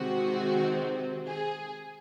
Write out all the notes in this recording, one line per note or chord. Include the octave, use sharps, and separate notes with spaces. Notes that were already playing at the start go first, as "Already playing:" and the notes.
Already playing: C3 D#3 G#3 C4 F#4
G#4